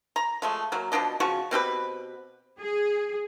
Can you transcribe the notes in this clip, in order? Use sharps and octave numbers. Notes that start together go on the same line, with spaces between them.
A#5
F3 G#3 A3
F#3 A#3
B2 F3 D4 D#5
C#3 F3 F#4 C#6
B2 C4 G4 B4
G#4